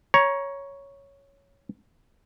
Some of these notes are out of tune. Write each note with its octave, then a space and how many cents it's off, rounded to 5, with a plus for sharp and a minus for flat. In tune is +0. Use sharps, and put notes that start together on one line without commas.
C#5 +0 A#5 +25